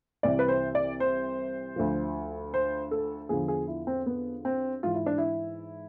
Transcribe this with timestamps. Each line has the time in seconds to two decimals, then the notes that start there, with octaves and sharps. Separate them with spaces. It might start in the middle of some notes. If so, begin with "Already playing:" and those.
0.23 C2 C3 E3 D5
0.39 B4
0.48 C5
0.75 D5
1.00 C5
1.76 D2 D3 F3
2.54 C5
2.91 A4
3.29 E2 D3 F3 G#4
3.48 G#4
3.68 E4
3.87 C4
4.06 B3
4.45 C4
4.83 G#2 E3 F4
4.95 E4
5.06 D4
5.18 E4